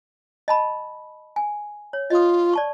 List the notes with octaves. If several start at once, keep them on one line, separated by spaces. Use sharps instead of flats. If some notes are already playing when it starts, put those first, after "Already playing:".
D#5 A5 B5
G#5
C#5
F4 D#5 D#6
D5 A5 C#6